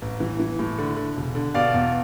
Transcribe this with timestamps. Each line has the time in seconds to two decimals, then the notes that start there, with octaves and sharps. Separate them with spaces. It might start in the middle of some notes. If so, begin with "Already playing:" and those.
0.02 A1
0.20 E3
0.40 E3
0.59 A2
0.78 D3
0.96 D3
1.16 E1
1.35 D3
1.54 B2 D5 F5
1.74 E2